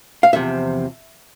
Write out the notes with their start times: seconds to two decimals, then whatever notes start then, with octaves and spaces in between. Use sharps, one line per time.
0.23 F5
0.33 E2 C3 F3 E5